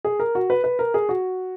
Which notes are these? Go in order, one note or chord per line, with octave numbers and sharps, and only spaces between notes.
G#4
A#4
F#4
B4
B4
A#4
G#4
F#4